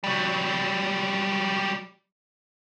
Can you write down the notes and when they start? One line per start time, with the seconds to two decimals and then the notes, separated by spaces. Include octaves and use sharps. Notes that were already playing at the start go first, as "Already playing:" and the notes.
0.04 F#3 G3